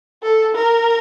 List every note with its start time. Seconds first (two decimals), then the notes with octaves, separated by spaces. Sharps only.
0.23 A4
0.55 A#4